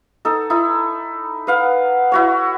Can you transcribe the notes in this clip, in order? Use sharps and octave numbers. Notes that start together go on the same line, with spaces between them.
D#4 A4
D#4 E4
B4 F5 F#5
E4 F#4 C#5